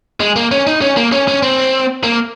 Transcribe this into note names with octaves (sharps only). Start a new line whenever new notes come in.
G#3
A#3
C#4
D#4
C#4
A#3
C#4
C#4
C4
A#3